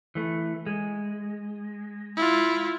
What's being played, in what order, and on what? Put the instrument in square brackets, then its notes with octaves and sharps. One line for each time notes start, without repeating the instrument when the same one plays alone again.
[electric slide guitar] E3 A3
G#3
[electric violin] E4 F4